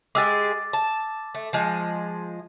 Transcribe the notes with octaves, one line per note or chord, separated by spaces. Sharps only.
G#3 G4 G#4 D6 E6 A6
A5
A3
F3 G#3